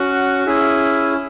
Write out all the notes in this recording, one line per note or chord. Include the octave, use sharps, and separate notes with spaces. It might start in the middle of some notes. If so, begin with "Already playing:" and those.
Already playing: C#4 F#4 F#5
C#4 E4 G#4 E5